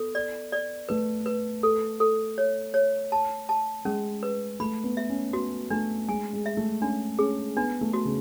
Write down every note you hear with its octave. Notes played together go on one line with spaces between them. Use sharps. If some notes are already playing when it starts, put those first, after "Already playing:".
Already playing: B3 A4
D5
D5
A3 B4
B4
A4
A4
C#5
C#5
A5
A5
G#3 C#4
B4
A3 B5
B3
E5
C#4
B3 F#4
A3 D4
G#3 G#5
G#3
E5
A3
C#4 D4
C#4 G#4
B3 D4
A3
F#4
C#3